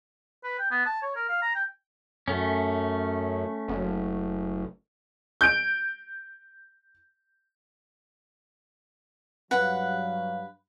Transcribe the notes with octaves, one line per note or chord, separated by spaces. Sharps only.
B4
G5
B3
A5
C#5
A#4
F5
A#5
G5
F#2 A3 C#4
F#1
G6 D7
G2 F#3 B4 F5 F#5